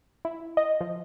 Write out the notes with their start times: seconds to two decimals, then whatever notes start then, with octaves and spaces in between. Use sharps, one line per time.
0.25 E4
0.57 D#5
0.81 F3